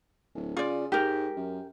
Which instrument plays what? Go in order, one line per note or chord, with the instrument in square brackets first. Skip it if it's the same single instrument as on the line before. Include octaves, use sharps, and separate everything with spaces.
[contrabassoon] D1
[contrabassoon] C#3 [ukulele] F4 D5
[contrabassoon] G#2 [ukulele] G4 A#4
[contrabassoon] F#2